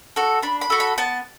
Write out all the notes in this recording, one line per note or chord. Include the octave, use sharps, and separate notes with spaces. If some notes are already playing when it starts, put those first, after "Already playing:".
F#4 A4
D4 B5
B5
F#4 A4
B5
B3 A5